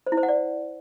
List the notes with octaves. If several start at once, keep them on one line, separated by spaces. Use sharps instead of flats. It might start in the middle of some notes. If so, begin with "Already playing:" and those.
C5
E4
C5
F#5
D5